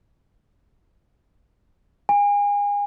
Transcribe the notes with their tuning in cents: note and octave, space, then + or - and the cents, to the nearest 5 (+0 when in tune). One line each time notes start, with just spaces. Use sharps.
G#5 -30